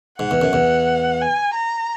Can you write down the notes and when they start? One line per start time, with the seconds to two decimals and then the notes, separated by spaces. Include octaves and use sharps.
0.19 G#2 F#5
0.31 E2
0.41 F#2
0.53 E2
1.21 G#5
1.54 A#5